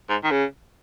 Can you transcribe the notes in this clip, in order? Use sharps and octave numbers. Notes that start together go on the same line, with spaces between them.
G#2
D#3
C#3